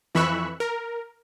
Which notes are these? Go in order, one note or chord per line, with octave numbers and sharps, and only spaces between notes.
F2 E3 B5 C#6 E6 F#6
A#4